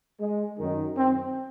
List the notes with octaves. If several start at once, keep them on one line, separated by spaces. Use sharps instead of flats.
G#3
F#2 D#3
C4